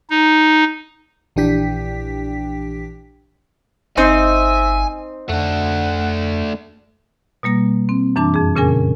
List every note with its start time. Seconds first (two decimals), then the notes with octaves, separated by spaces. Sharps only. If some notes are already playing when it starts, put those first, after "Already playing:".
0.10 D#4
1.36 A#1 E3 D4 G4 G5 B6
3.97 G1 C4 D#4 C5 E5 G#5
5.29 F2 A3 D4 F#5
7.43 B2 G3 A#3 A#6
7.89 C4
8.16 F#2 E3 D4 A5 D6
8.34 F2 G#4
8.55 A#2 C#3 C#4 G#4 A#4 G#5